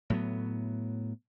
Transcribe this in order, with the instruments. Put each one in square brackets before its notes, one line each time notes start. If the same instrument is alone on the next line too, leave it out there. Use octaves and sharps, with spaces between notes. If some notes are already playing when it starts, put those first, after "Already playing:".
[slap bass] A2 F#3 B3